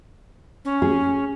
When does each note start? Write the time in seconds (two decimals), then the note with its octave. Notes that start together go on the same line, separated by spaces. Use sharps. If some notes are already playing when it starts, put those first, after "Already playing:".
0.65 C#4
0.82 G#4